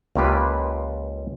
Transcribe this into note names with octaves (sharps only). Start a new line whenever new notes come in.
C#2 A#3 F4 G4 B4